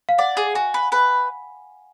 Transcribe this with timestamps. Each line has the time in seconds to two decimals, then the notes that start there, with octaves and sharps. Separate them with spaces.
0.09 F5
0.18 D5 F#5
0.37 G#4
0.55 F#4 G#5
0.74 B4
0.92 B4